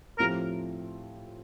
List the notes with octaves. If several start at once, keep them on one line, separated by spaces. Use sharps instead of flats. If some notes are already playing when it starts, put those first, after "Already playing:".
A2 F3 C4 G4 A#4